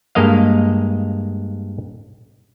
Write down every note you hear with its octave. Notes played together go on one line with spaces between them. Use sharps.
G2 G#3 A#3 D#5 F5